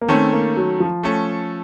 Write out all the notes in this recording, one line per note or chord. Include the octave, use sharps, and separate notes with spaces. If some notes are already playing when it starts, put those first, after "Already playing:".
A#3
D#3 A3 C4 C#4 A4
A#3
F#3
F3
A3 C#4 A4